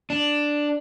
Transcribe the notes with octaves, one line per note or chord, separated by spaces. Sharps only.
D4